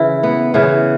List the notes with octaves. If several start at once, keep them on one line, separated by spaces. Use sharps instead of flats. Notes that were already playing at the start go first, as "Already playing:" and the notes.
Already playing: C#3 E3 E4
B3
C#3 E3 B3